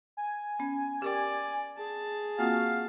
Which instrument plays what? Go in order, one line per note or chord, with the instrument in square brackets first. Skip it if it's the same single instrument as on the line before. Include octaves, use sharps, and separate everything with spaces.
[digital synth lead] G#5
[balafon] B3 C#4
[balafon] G4 A#4 G5 [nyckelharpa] D5
[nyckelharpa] G#4 A5
[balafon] A#3 C4 F4 [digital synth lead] F#4 [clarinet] F5